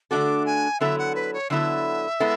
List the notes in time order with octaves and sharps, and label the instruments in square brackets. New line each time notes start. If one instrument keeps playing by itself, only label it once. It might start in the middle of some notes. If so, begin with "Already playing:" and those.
[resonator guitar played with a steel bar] D3 A3 D4 F#4 A4 [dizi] D6
[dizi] G#5
[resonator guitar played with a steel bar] D3 F#3 B3 E4 A4 [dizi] E5
[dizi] F#5
B4
C#5
[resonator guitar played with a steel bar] D3 F#3 B3 E4 A4 [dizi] E5
[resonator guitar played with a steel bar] G#3 B3 E4 A4